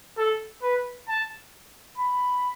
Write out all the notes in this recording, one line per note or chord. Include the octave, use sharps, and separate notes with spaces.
A4
B4
A5
B5